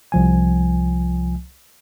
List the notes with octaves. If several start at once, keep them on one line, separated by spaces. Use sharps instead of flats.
C2 F3 G#5